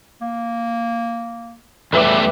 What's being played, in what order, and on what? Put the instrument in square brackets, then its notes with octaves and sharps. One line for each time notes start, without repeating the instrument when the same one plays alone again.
[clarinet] A#3
[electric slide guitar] E2 G3 A3 [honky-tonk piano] B4 E5 D6